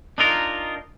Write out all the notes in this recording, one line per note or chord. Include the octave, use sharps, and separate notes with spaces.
D4 D#4 F4 A#4